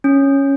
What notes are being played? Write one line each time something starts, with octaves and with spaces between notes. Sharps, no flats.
C#4